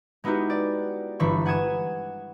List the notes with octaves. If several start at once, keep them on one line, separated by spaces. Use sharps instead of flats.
G#3 B3 D#4 E4 F#4 G4
D5
G1 E3 B5 C#6
F#5 G#5 D#6 G#6 E7